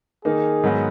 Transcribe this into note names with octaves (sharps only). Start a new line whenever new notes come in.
D#3 A#3 D#4 G#4
G#2 D#3 F#3 B3 F#4